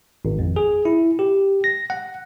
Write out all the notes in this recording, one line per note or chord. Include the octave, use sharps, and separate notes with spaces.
G#1
F2
G#4
E4
G4
A#6
F#5